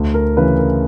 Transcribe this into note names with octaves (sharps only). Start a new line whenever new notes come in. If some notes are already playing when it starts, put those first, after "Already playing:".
Already playing: D2
A#4
C#3 E3 B4
A#4